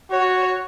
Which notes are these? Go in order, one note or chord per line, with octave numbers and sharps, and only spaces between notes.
F#4 C#5